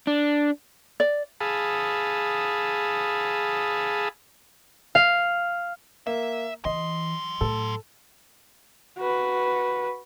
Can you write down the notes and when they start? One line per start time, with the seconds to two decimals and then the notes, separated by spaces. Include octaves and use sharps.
0.07 D4
1.00 D5
1.41 G#4 F5 A5 B5 D#6 E6
4.95 F5
6.07 A#3 E5
6.65 E3 F#3 D#5 C6
7.41 A2 A4
8.98 F#4 B4